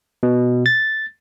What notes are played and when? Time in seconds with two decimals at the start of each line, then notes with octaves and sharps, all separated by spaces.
0.23 B2
0.66 A6